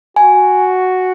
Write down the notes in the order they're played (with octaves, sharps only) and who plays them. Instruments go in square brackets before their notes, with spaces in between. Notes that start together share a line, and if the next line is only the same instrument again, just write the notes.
[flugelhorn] F#4 [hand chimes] G#5